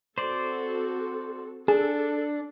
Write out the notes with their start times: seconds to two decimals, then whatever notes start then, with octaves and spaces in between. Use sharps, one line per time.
0.18 C4 F#4 A4 C5 D5
1.68 D4 G#4 A4